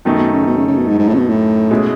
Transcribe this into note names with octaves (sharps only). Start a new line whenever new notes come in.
F#2 B2 D#3 A3 D#4
B2
C#3
B2
C#3
C#3
B2
G#2
G#2
A2
C#3
B2
A2
B2 G#3 C#4 E4